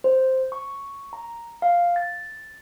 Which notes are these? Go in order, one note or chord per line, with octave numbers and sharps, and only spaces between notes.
C5
C#6
A#5
F5
A6